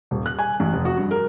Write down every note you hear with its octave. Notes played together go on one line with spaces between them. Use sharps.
D#1
F#6
G#5
A1
F1
F#4
G2
A#4